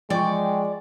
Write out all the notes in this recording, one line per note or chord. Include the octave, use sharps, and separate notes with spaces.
F3 G#3 D5 G5 C#6